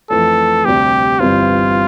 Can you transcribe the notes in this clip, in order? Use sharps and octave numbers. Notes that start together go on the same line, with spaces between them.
F2 E3 A3 A4
D2 C3 G3 C4 G4
G1 G2 E3 G3 C4 F4